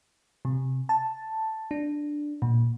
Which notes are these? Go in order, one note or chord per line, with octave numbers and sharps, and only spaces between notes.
C3
A5
D4
A#2